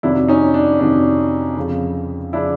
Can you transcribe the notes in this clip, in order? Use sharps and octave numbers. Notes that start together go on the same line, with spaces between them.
F2 C3 D#3 F#3 D4 E4
C#4 D#4
D4
F2 C3 D#3 F#3 D4
F2 C#3 F3
C#3 F3 D4 E4